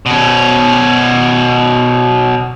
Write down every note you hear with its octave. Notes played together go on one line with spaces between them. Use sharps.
B2 C#4